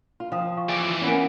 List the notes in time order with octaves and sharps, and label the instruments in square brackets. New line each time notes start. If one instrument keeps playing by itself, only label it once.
[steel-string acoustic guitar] F4
[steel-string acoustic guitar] F3 [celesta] F5 G5 D#6
[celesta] F5 C#6
[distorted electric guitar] E3 D5 [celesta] G#5 D7 F7
[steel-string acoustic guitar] A#3 B3 C#4